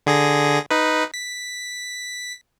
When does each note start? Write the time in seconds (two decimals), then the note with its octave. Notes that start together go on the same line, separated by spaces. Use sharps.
0.07 D3 G#4 A#6
0.71 D#4 B4
1.14 B6